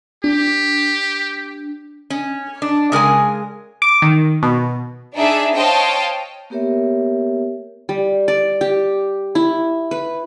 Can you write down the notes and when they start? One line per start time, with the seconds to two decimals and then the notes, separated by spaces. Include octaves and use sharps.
0.24 D4 G4
2.10 C#4
2.62 D4
2.92 C#3 G#3 A#4 G#5
3.82 D6
4.02 D#3
4.43 B2
5.14 D4 D#4 G#4 D5 E5
5.56 C5 C#5 D#5 F5 G5 A5
6.50 A#3 B3 G4 A#4 C#5 E5
7.89 G3
8.28 D5
8.61 G4
9.35 E4
9.91 B4